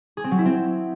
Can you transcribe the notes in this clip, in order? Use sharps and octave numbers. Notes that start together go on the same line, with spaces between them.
G#4
C4
F#3
E4
C4